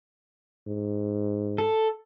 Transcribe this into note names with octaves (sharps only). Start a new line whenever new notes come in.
G#2
A4